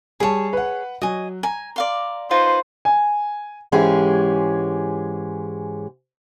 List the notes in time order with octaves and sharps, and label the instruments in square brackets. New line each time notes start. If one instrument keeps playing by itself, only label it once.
[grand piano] G3 A5 [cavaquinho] G#4 C#5
[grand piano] B4 F#5
[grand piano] F#3 [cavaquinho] D#5 G#5
[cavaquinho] G#5 [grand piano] A#5
[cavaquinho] D5 F5 C6
[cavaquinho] D#4 F4 B4 [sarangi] C5
[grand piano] G#5
[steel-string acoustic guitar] G#2 E3 G#3 C#4 G4 G#4